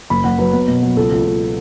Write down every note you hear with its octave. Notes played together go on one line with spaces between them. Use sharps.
F#1 B5
F#1 F#5
F#3 B4
B3
B2
F#3
C#2 A4
C#2
C#2